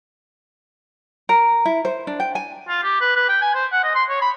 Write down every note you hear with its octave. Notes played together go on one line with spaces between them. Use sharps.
A#4
E4
C5
D4
G5
G#5
F4
G4
B4
B4
G5
G#5
C5
F#5
D#5
C6
C#5
B5